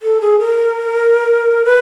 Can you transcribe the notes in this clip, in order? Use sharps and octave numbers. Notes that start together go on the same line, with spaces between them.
A4
G#4
A#4
B4